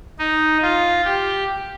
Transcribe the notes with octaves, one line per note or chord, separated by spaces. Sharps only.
D#4
F4
G4